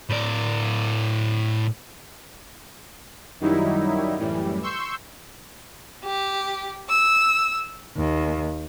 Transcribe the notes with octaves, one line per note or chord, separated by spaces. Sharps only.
A2 D5
F#2 D#3 F#3 G3 D#4 E4
F#2 A2 E3 G3
C6 C#6 E6 G6
G4
E6
D#2